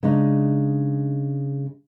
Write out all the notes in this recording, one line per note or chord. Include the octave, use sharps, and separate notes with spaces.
C#3 G#3 D4 D#4